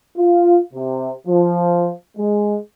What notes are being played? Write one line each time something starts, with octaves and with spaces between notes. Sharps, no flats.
F4
C3
F3
G#3